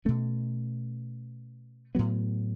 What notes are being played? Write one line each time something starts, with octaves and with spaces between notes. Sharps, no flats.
B2 A3 C#4
A2 F#3 B3